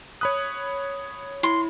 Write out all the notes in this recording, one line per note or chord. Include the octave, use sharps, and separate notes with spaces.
C#5 B5 D#6 F#6
E4 C6